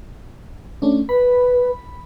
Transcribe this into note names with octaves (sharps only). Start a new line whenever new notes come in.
A3 C#4 D4
B4 B5